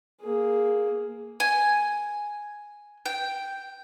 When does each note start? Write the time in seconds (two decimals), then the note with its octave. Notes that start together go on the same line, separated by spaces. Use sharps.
0.21 A#3 G#4
1.40 G#5
3.06 G5